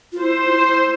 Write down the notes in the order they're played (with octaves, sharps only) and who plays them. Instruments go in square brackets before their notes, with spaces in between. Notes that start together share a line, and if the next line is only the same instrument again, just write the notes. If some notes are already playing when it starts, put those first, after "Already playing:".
[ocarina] F4
[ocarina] E4 [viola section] C5
[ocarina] F4
E4